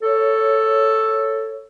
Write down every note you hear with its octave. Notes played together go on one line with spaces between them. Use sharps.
A4 C#5